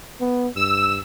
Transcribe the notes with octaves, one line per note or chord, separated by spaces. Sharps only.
B3
G2 E6